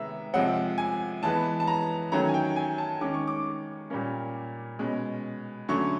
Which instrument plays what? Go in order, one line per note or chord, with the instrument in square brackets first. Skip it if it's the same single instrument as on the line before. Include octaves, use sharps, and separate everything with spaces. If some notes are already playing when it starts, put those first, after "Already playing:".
Already playing: [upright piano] C3 D#3 G#3 B3 E5 A#5
C3 F3 G#3 C4 F#5
G#5
E3 G#3 B3 A5
A5
A#5
D#3 F#3 A3 C#4 A#5
G#5
G5
G#5
A5
D#3 G#3 C#4 D6
C#6
D6
A#2 G3 A#3 C#4
B2 G#3 C#4
D3 F#3 A3 C#4 C#6